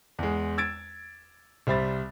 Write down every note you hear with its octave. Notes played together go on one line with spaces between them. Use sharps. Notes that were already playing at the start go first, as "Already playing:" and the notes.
E2 G#3
E6 G#6 A6 D7
C2 G3 C5 E5 B5 A6